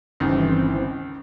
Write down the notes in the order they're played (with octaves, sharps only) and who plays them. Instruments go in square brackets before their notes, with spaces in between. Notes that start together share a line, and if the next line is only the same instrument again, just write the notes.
[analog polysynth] G1 E3 C4 [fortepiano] C#2 D#3